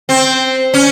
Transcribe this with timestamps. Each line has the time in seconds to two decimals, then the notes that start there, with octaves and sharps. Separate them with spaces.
0.09 C4
0.74 C#4